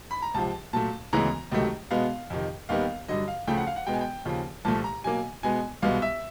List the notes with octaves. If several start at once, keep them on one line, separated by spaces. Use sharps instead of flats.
B5
A#5
C#2 C3 F3 A5
A#2 F#3 A3 A5
D2 C#3 E3 G#3 B3 A#5
C#2 C3 D#3 F#3 A3
B2 G#3 B3 F5
F2 C3 D#3
D#2 D#3 G3 B3 F5
G2 D3 F#3 D#5
F5
D2 C#3 F3 A3 G5
F#5
F5
F#5
B2 G#3 B3 G5
G#5
G5
D#2 C#3 F3
C2 A#2 F3 A3 A5
A#5
B2 F#3 A#3 G#5
B2 G#3 B3 G#5
C2 B2 G#3 B3 F5
E5